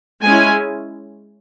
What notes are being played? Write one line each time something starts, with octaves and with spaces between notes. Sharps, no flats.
G#3 C#4 E4 G#5